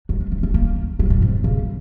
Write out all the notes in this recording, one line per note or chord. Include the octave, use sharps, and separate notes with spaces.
F#3
G#3
C#4
C#4
A#3
F#3
F#2
G#2
C#3